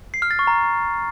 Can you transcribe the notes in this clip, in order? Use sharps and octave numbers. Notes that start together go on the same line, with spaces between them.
C7
F6
A6
C#6
A#5